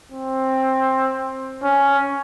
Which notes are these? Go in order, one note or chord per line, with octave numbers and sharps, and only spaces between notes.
C4
C#4